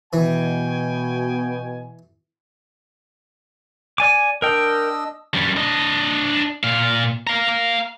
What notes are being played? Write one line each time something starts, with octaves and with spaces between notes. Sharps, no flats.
B2 E3 G5 G#5
D5 G#5 D6
D4 A#4 D#5 G5 E6
F#2 G3
D4 D#5
A#2 F5
F5 A#5